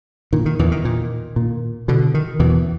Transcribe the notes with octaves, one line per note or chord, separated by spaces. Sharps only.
A#2 D#3
D#3
E2 E3
D#3
A#2
A#2
B2 D3
D#3
E2 B2 E3